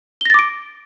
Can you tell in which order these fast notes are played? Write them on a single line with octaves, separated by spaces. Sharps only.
G7 A#6 A6 D6 D7